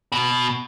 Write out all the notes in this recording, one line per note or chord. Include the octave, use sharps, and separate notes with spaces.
B2